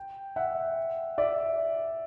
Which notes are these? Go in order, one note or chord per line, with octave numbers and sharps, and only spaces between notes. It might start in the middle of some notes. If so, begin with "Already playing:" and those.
Already playing: G5
E5 F#5
D5 E5